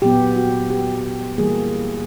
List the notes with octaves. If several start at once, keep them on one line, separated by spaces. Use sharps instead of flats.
A#2 F#3 B3 G4
F#4
G4
E3 G3 A#3 G#4